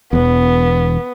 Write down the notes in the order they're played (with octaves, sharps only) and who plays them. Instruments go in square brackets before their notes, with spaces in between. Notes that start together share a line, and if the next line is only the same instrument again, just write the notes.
[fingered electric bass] E1 E2 [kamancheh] B3